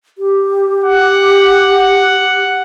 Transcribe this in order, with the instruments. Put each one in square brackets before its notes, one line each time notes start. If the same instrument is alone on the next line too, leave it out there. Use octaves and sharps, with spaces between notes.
[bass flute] G4
[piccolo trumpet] F#5